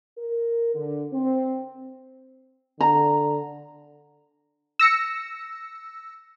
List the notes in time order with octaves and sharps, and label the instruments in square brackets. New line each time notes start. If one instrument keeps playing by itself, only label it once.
[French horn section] A#4
D3
C4
[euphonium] D3 [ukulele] A#5
[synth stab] E6 A#6 C#7